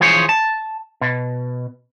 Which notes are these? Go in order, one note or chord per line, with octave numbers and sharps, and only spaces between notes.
E3 F3 G#4 C5 C#5
A5
B2